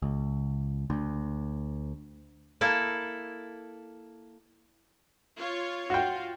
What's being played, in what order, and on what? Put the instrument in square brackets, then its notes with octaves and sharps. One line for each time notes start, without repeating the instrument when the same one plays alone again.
[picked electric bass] C#2
D2
[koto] A#3 E4 A4
[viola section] F4 C#5
[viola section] F4 [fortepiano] F#4 G5